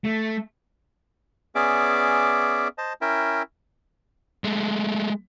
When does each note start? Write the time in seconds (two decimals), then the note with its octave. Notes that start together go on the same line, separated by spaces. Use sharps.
0.05 A3
1.55 B3 C#4 G#4 D5 E5 D6
2.78 C5 D#5 A5
3.01 C#4 E4 A#4 E5 G5
4.44 G#3 A3